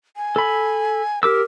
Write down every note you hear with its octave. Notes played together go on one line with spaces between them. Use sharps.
G#5
A4 B5
G4 A#4 D6 E6